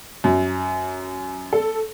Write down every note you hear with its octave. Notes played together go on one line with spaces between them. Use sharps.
F#2
A4